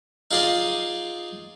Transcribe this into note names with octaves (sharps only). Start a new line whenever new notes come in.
D#4 F4 G#4 D5 D#5 C6